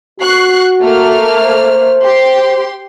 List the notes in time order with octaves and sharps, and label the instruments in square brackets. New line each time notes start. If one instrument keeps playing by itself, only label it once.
[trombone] F#4 [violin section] C#6 F#6 C7
[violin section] A3 A#3 F6
[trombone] C5
[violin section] G4 C6